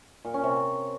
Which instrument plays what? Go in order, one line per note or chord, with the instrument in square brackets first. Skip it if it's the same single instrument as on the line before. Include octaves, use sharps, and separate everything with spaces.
[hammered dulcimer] A#2
C#4
C3